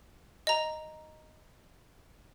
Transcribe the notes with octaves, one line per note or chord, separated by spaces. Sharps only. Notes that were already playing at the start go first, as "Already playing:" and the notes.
D#5 A#5